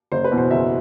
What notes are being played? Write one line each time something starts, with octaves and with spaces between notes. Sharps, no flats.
F#1 C5
B4
E2 B2
C5
F#1 E5